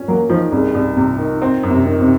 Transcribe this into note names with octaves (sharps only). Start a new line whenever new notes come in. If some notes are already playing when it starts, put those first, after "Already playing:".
Already playing: C#4
F#3 A#3
D#3 F3
C2 C#3
C2
C3
D#3
C4
F#2
C3
D#3
C3